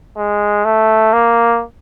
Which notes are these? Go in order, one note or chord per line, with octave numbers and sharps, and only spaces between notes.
G#3
A3
A#3